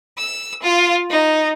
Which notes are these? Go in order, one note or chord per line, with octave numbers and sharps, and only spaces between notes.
E6
F4
D#4